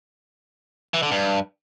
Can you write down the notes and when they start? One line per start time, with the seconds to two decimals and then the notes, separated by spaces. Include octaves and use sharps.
0.94 E3
1.03 D3
1.11 G2